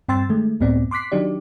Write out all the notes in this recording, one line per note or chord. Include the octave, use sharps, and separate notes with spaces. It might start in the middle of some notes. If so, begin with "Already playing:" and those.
G2 C4 G5 C6 E6 A6
D#3 G#3 A3
C#2 F#2 A2 B3 C4 D5
C6 D6 F#6 B6 C7
D#3 F#3 D4 D#4 G4 D5